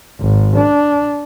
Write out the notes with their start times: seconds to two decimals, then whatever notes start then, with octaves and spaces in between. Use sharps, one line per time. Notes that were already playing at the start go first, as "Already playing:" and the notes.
0.21 G#1
0.57 D4